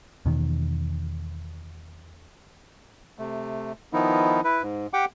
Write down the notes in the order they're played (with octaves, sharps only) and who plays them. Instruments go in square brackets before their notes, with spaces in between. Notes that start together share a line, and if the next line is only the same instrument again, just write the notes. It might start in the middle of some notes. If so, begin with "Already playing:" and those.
[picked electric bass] E2 B2 D#3
[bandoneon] C3 A3
D#3 F3 B3 D#4 E4
E4 B4
G#2
G4 F#5 G5 D6